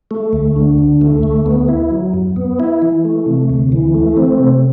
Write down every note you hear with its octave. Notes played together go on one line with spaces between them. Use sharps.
A3
D2
D3
D2
A3
D2
B3
E4
F#3
F#2
B3
E4
E3
A3
C3
D2
E3
A3
C4
C3